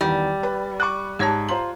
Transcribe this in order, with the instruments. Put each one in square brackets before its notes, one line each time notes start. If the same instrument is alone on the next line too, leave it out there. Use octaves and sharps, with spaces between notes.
[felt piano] E2 D#3 [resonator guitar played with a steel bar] G3 [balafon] D5
[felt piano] B4 B5
C#6 D6 F#6
[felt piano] G#2 G#6 [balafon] G4 C#5 A5
[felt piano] F4 C5 [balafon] A#5